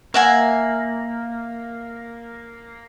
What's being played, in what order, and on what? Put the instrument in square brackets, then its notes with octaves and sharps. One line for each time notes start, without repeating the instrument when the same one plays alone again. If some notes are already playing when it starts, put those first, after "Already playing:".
[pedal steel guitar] A#3 [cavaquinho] E5 F#5 G#5